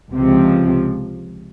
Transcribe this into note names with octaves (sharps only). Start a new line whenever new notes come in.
C#2 C3 F3